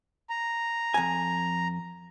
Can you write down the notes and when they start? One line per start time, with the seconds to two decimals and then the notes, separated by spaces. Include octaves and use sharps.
0.30 A#5
0.94 F2 G#5